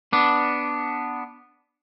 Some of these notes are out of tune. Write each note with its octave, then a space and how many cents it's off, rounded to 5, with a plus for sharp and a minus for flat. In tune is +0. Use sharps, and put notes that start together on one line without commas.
B3 +0 D4 +0